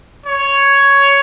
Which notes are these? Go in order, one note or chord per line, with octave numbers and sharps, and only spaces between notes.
C#5